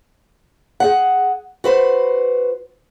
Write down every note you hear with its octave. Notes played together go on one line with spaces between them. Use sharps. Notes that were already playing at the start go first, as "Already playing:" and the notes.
G#4 F#5
F#4 B4 C5